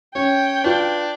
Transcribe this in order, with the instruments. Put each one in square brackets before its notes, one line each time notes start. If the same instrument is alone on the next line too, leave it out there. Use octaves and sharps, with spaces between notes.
[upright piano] C#4 [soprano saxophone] C#5 [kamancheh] G5
[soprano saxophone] D4 [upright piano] F4 B4